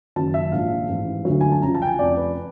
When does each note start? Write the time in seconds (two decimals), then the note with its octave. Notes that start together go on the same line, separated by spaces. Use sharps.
0.16 F#1 F#2 D#3 F#3 A5
0.34 E5
0.52 A#1 G#2 F3 F5
0.89 A1 G#2 E3
1.25 D2 D3 F#3
1.41 G#5
1.51 A5
1.62 C#2 C#3 F3 A#5
1.75 A5
1.82 G5
1.87 G#5
1.99 F1 F2 C3 F3 D5
2.17 B4